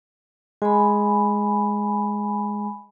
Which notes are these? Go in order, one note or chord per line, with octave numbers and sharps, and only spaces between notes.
G#3 G#5 B5